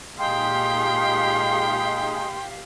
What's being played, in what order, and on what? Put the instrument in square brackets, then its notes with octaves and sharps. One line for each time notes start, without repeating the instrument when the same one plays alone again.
[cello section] A#2 G4 F5 [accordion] G#3 D#4 G#4 [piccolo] G5 [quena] C6